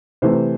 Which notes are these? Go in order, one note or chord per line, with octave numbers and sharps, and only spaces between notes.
C3 E3 A3 C5